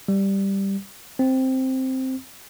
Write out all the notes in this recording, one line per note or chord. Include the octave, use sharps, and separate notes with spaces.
G3
C4